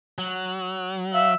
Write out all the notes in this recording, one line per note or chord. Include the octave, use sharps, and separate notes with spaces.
F#3
E5 F5